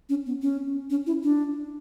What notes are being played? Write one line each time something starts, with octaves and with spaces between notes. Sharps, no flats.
C#4
B3
C#4
C#4
E4
D4